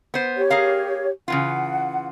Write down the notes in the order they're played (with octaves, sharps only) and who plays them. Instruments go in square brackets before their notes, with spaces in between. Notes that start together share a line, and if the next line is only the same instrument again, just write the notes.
[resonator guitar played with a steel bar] B3 C5
[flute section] G4 C#5
[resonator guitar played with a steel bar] G#4 A#4 F5
[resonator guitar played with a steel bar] C#3 E3 F4 [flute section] F#5